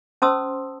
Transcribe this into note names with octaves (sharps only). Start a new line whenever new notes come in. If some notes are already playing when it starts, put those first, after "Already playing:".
C#4 C5 A5 C6 D#6 E6